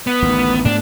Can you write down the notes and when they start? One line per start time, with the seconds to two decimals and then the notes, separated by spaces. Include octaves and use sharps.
0.07 B3
0.23 A1 D2 D#3
0.65 G#2 A3 B3 D4